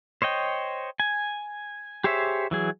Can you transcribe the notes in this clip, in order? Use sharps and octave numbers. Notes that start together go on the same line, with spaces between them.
C5 C#5 D#5 G5
G#5
G4 G#4 C5 C#5 E5
E3 F#3 G#4